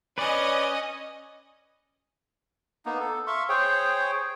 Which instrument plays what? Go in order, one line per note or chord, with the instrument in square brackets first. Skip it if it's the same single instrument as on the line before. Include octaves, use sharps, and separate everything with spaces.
[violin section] C#4 D#5 [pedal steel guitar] B4 D5
[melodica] A#3 B3 D#4
A4
E5 F5 C6 C#6
G#4 C5 C#5 G5